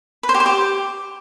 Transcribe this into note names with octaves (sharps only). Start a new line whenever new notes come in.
B4
C5
G4
C5
G4